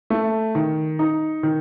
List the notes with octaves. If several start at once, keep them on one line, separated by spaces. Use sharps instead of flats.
A3
D#3
D#4
D#3